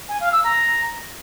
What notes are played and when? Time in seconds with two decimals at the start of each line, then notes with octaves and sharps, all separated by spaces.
0.09 G#5
0.20 F5
0.32 E6
0.44 A#5